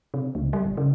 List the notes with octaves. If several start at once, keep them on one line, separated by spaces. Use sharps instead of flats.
C3
C#2
G3
F#1
C#3